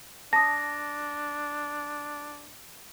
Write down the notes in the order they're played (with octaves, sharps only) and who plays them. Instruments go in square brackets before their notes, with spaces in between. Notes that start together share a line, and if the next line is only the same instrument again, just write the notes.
[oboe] D4 [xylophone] A5 D#6 [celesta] A#6